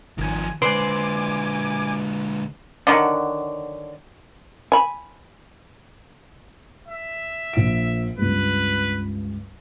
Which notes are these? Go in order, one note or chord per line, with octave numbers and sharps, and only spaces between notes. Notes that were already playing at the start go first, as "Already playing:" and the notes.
G#1 D#3 F3 G#5
D3 G#3 B4 C5 D5 G#5 C6 D6
D3 D#3 F#3
G#5 B5
E5
A#1 D7
C#2 G2 B4